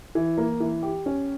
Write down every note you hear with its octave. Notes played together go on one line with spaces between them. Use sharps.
E3
A#3
E3
G4
C#4